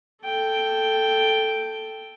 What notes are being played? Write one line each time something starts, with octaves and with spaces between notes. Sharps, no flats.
A4 G5